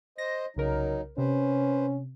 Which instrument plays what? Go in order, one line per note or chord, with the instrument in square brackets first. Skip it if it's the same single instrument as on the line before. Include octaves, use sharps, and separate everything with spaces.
[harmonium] C5 D#5 [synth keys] A#6
[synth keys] C2 C#3 A#4 [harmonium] F#3 D#4
[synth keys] C3 [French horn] C#4 [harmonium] B4 C5